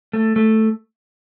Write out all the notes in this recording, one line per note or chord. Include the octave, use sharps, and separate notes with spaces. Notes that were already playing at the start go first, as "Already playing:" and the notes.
A3
A3